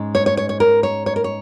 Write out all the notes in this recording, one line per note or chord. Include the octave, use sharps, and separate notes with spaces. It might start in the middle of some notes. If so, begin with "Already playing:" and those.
Already playing: G#2 G#3 C#4
C#5
C#5
C#5
C#5
A#4
C#5
C#5
A#4
C#5